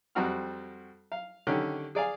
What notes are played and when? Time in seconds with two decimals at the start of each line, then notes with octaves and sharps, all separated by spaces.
0.15 F2 G3 C4 F#4 F#5 F6
1.12 F5
1.47 D3 D#3 C#4 G4
1.95 G#4 D5 F5 G#5